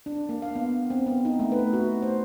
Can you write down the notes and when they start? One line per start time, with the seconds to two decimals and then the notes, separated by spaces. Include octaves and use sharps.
0.06 D4
0.29 A#3
0.42 F5
0.55 B3
0.90 C4
1.07 B3
1.25 D#4
1.39 A3
1.52 B4
1.73 F#4
2.02 C5